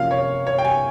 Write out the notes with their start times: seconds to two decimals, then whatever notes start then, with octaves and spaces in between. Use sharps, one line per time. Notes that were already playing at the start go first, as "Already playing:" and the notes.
Already playing: C3 F3 A#3 C#4 F4 F5
0.11 C#5
0.47 C#5
0.59 G5
0.65 G#5